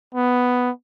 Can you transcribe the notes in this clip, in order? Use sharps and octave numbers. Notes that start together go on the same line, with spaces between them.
B3